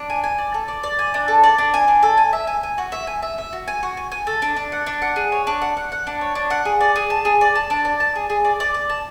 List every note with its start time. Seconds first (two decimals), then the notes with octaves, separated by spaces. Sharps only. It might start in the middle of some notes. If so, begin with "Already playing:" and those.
Already playing: D4
0.10 G#5
0.24 G#5
0.38 D5
0.54 A4
0.68 D5
0.83 D5
0.99 G#5
1.14 D4
1.28 A4
1.44 D5
1.58 D4
1.74 G#5
1.88 D4
2.03 A4
2.18 G#5
2.33 E5
2.47 G#5
2.63 G#5
2.78 F#4
2.92 E5
3.07 G#5
3.22 E5
3.38 E5
3.53 F#4
3.68 G#5
3.83 F#4
3.97 G#5
4.12 G#5
4.27 A4
4.42 D4
4.56 D4
4.72 F#5
4.86 D4
5.02 F#5
5.16 G#4
5.32 C#5
5.47 D4
5.61 F#5
5.77 F#5
5.92 F#5
6.07 D4
6.21 C#5
6.35 D4
6.50 F#5
6.65 G#4
6.81 D5
6.96 G#4
7.10 A5
7.25 G#4
7.41 D5
7.55 A5
7.70 D4
7.85 D5
8.00 A5
8.16 G#4
8.30 G#4
8.45 D5
8.60 D5
8.74 D5
8.90 A5